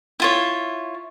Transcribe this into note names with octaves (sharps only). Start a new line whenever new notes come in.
E4 F4 C#5